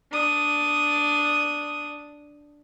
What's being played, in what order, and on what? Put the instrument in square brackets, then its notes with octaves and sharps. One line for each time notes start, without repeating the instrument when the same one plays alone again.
[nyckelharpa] D4 D#6